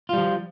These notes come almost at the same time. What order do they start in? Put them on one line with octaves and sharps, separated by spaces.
F4 G3 F3